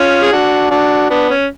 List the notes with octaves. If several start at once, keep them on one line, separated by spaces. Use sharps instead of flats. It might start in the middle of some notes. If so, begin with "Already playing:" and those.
Already playing: C#4 F4
G#4
D4 F#4
D4 F#4
B3 D4
C#4